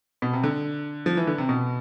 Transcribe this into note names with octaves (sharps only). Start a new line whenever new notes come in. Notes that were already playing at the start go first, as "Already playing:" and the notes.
B2
C3
D3
F3
E3
D3
C3
B2